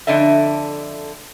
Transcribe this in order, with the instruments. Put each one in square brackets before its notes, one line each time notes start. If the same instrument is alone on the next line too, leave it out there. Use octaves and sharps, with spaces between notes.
[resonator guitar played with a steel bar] F2 G#2 D3 D4 D#5 E5